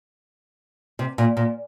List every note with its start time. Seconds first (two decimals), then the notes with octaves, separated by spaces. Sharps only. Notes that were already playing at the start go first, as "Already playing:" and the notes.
0.99 C3
1.18 A#2
1.37 A#2